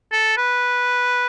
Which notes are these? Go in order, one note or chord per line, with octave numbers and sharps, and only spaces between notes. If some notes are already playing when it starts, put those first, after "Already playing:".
A4
B4